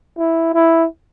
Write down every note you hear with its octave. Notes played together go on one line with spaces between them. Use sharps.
E4
E4